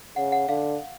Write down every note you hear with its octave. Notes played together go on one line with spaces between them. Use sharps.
C#3 F#5
F#5
D3 F5